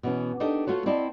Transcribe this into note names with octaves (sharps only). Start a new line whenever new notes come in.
B2 E3 C#4
D4 D#4 G4 A4 A#4 D#5
A3 F4 F#4 C#5
C4 E4 D5 D#5 A5